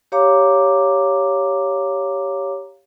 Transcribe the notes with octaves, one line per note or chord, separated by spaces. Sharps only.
G4 C#5 F5 A#5 D6